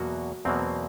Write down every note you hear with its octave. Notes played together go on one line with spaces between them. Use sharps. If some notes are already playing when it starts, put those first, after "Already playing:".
Already playing: E2 B2 F#3 A#3 F#4
E2 B2 F#3 A#3 C4